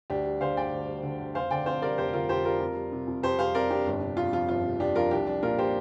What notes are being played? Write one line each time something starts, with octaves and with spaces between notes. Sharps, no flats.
D2 D4 G4
G3
D3 C5 F5
D2 D5 G5
D2
G3
D3
D2
F1 C5 F5
D3 D5 G5
F2 C5 F5
G3 A#4 D5
F1 G4 C5
D3 F4 A#4
F2 G4 C5
G3 F4 A#4
F2
G3
C3
F2
F2 G4 C5
G3 C5 F5
C3 A#4 D5
F2 D4 G4
G1
C3
F2 F4
F3 F4
G1 F4
C3
F2 D4 G4
F3 F4 A#4
C2 D4 G4
F3 D4
A#2 F4 A#4
G4 C5